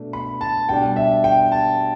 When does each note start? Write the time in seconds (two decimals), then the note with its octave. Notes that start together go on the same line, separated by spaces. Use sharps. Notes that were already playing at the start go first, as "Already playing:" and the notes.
Already playing: B2 A3 D4
0.13 B5
0.41 A5
0.69 B2 G3 D4 G5
0.96 E5
1.24 G5
1.52 A5